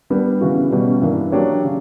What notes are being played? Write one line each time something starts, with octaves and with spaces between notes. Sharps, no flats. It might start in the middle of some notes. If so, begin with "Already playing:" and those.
G3 B3 D4
C#3 E3 B3 F#4
B2 G3 C#4
G2 E3 A#3 D4
F#3 A#3 D4 G4 C#5
C#3